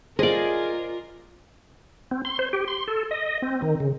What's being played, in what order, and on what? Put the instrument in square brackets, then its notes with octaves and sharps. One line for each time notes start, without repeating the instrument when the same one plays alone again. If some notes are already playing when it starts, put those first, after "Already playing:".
[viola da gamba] F4 A#4 [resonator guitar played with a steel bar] G#4 [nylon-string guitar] C5 F5 [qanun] D5 D#5
[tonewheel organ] C4
C6
C5
G4
C6
A4
D#5
C4
D#3
C#3